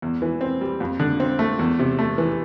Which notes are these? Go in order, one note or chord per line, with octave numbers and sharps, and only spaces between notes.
E2
E3
C4
G3
F2
D3
C4
A3
E2
C3
A3
E3